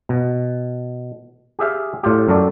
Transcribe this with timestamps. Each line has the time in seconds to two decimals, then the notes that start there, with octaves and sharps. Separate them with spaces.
0.09 B2
1.59 G4 G#4 E5 F5
2.03 A2 F4 G4
2.27 F#2 F#3 A4 D5